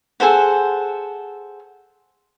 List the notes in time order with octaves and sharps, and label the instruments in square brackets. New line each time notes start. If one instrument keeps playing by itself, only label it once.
[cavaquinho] G#4 A4 C5 F#5